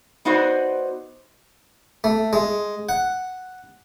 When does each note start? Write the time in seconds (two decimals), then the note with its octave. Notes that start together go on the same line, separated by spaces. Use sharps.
0.25 B3 D#4 F#4 C5 D5
2.04 A3
2.33 G#3
2.89 F#5